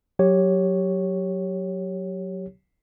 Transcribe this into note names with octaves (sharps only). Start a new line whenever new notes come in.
F#3 G4 C#5